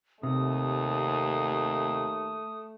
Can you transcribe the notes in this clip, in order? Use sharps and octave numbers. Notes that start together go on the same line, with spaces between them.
D#2 C3 A3 D#6